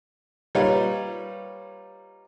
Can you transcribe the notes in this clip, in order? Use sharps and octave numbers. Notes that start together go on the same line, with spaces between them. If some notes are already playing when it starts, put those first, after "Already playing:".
G3 A#3 D#4 F4 B4 C#5